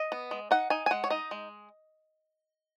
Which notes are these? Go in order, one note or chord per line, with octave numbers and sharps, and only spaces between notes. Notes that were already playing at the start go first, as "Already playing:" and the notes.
Already playing: D#5
B3
G#3
D#4 F#5
D#4 G#5
G#5
G#3 F#5
C#5
D#4 D#5
G#3